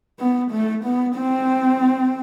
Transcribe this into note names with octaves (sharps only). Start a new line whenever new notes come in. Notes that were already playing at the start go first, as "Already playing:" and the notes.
B3
A3
B3
C4